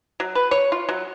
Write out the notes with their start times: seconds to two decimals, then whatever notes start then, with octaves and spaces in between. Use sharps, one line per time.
0.20 F#3
0.35 B4
0.51 C#5
0.72 F4
0.89 F#3